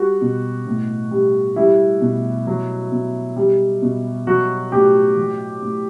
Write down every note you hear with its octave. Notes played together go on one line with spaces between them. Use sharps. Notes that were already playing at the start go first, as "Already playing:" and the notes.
Already playing: G3 F#4
B2
A2
G3
G3 E4
B2
F#3
B2
G3
B2
F#3 F#4
A2 G4
F#3
A2